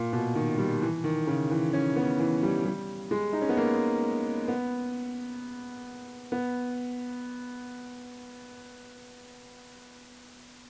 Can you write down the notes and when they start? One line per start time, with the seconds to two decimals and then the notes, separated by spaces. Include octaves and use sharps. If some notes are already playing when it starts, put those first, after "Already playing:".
Already playing: A#2
0.13 B2
0.35 D#3
0.58 G3
0.82 E3
1.04 D#3
1.27 C#3
1.51 E3
1.73 C#4
1.96 B3
2.19 E3
2.43 G3
2.65 G3
3.11 G#3
3.33 D#4
3.42 C#4
3.49 B3
3.57 A#3
4.48 B3
6.32 B3